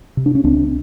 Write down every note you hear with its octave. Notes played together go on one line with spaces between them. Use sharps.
C3
D4
C#4
C#2 C4 D4